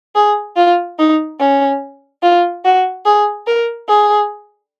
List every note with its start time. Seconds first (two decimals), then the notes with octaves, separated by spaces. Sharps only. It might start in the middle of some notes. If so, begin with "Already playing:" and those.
0.15 G#4
0.57 F4
0.99 D#4
1.40 C#4
2.23 F4
2.65 F#4
3.05 G#4
3.47 A#4
3.89 G#4